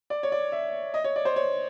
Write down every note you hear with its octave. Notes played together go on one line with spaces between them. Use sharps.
D5
C#5
D5
E5
D#5
C#5
D5
C5
C#5